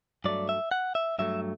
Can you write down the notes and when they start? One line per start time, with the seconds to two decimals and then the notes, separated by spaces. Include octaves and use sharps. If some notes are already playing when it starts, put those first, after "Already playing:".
0.24 G2 F#3 A3 D5
0.49 E5
0.71 F#5
0.95 E5
1.19 G2 F#3 A3 E5